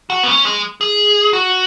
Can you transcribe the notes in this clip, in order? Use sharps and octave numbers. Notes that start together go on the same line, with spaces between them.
F#4
B3
C#4
G#3
G#4
F#4